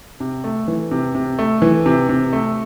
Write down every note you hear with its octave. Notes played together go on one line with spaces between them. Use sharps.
C3
A3
E3
C3
C3
A3
E3
C3
C3
A3